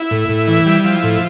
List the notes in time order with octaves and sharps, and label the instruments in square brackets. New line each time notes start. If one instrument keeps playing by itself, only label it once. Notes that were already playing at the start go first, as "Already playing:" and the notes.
Already playing: [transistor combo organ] E4
A2
A2
E3
G3
F3
A2